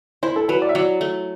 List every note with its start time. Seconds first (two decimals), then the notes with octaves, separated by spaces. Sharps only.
0.23 E4 C5
0.36 A4
0.48 F#3 B4
0.62 D5
0.69 E5
0.75 F#3 D5
1.01 A3